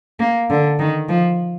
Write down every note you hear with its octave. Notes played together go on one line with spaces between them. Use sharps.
A#3
D3
D#3
F3